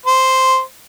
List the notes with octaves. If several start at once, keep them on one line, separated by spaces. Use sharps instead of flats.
C5